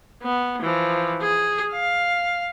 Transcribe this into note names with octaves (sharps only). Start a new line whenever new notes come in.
B3
E3 F3
G#4
F5